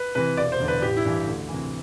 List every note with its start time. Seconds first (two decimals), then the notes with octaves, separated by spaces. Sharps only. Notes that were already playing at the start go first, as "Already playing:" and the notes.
Already playing: B4
0.15 C3 E3 B4
0.37 E1 D5
0.52 C5
0.60 E2 D3
0.68 B4
0.82 A1 G4
0.97 E4
1.05 G2 E3
1.27 D2
1.49 C3 E3